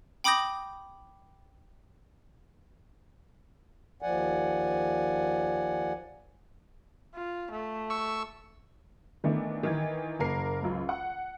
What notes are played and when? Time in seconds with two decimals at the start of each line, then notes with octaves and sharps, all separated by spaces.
0.24 G5 B5 D6 D#6 G6 A#6
4.02 D#2 F3 D5 F#5 G#5
7.15 F4
7.51 A3
7.90 C#6 E6
9.24 D#3 E3 A3 B3 D4
9.63 D#3 E3 G#6
10.19 F#1 A#3 A#4 C7
10.63 C#2 F#2
10.89 F#5